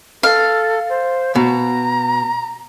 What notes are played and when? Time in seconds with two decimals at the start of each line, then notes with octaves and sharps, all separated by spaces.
0.23 A4 F5
0.89 C5
1.35 B2 A#5